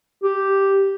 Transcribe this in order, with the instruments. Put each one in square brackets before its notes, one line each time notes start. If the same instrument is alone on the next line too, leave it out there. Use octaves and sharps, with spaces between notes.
[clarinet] G4